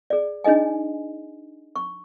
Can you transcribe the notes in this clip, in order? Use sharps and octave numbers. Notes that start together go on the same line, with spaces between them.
G#4 D5
D4 D#4 G#4 D#5 G#5
C#6